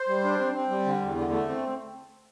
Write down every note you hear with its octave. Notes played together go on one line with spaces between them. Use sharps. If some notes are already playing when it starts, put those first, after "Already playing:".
Already playing: C5
G3
D4
C4
C4
G3
D3
E2
D3
A3
C4